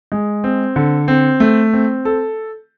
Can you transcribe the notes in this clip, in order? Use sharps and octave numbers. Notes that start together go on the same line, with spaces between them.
G#3
C4
D3
C4
A3
C4
A4